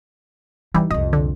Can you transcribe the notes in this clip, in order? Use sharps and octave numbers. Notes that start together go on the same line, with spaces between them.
E3 G3 D#4
C2 F2 D#5
D3